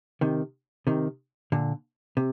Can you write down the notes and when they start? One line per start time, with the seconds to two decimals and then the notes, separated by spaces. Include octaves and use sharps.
0.21 C3 D#3
0.87 C3 D#3
1.52 A#2 D3
2.17 C3